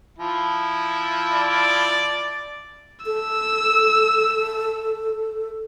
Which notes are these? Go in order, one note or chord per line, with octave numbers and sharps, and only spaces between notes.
F3 E4
D5
A4 E6